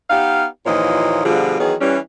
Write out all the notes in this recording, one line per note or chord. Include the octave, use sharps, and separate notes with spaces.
B3 D#4 G4 F5
D#2 A#2 E3 F3 C#5 D#5
B2 D3 F3 G3 F4 G#4
D#3 E3 F#3 B3 G#4
E3 G3 C#4